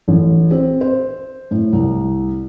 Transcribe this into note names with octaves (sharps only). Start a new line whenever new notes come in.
A1
C4
C5
A2
C2